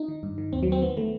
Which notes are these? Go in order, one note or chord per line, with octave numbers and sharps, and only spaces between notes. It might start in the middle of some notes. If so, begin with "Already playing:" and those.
Already playing: D#4
D#3
G2
D#3
D#2 C4
F#3
D#2 C4
D#3 B3
D#3 A3